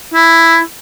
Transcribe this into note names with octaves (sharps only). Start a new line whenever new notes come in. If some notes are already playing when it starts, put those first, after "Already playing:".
E4